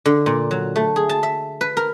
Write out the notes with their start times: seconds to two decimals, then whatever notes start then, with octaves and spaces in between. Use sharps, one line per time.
0.06 D3
0.26 A#2
0.51 F#3
0.76 A3
0.96 G#4
1.09 A5
1.23 E5
1.61 B4
1.77 A#4